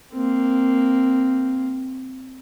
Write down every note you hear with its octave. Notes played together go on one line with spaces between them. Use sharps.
A#3 C4